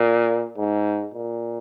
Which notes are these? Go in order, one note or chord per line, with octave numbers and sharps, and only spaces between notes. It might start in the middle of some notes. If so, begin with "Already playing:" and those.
Already playing: A#2
G#2
A#2